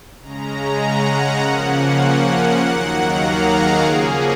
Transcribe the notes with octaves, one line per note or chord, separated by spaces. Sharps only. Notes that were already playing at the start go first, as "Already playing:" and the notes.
C#3 G#3 C#4 A#5
F#5
C#3 F3 A#3 C#4 F#5
F#5
D#2 D#3 F#3 A#3
A#5
F5
G#4
C#3 F3 A#3 C#4 G#4